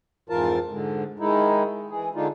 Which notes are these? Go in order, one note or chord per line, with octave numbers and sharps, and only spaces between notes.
F2 G#2 E3 F4 A#4 A5
G#2 D3 G#3
D#3 G#3 D#4 E4
E3 G#4
D3 G#3 D4 D#4 F4